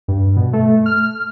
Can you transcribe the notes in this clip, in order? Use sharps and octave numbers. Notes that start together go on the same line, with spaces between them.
G2
B2
A3
F6